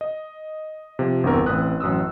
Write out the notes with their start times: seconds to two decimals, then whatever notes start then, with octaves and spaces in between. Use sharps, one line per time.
0.01 D#5
0.99 C3 F3
1.24 G1 E2 G2 C4 A#4 E6
1.46 A1 C4 B4 D#6 F#6
1.80 A1 F#2 D#6 E6